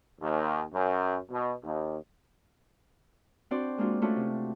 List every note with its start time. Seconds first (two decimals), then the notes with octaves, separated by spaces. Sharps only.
0.21 D#2
0.73 F#2
1.30 B2
1.64 D#2
3.51 C4 D4 F#4 C5 D5
3.78 G#3 A#3 D4 F4 F#4
4.02 A3 C#4 D4 F4 F#4 A5
4.16 C3